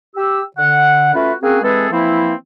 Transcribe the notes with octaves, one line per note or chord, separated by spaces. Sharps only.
G4 E6
D3 F#5
A3 C#4 F4 F#4 B4 E5
A#3 C4 C#4 F#4 G#4
E3 G#3 C4 G#4 A4 B4
E3 F3 A#3 C4 E4